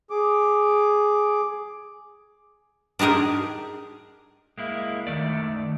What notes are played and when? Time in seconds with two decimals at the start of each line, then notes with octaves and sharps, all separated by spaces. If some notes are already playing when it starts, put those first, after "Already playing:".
0.10 G#4 D6
2.99 D4 D#4 G4 G#4 A#4
4.58 G#3 A#3 E4
5.07 D#3 A3 D5